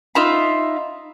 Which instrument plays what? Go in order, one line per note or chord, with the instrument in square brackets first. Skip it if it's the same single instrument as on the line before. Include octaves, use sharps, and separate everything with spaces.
[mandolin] D#4 F4 E5 B5